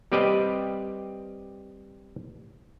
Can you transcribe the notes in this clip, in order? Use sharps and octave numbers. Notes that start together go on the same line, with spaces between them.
G3 C4 G4 B4 D5 D#5